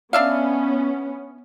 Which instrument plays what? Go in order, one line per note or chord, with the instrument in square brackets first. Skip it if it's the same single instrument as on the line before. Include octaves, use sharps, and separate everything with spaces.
[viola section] B3 C#4 [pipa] D4 E5 F5